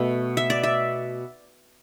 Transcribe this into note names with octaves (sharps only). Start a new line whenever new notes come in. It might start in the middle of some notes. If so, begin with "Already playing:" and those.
Already playing: B2 A3 E5
E5
D5
E5